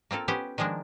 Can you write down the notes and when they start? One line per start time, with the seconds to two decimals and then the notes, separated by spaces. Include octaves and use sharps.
0.11 A#3 C4 F4 A4
0.28 B3 C#4 G4 C5
0.58 D#3 F3 G#3 A#3 D4